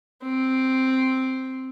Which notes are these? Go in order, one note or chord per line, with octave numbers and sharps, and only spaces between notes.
C4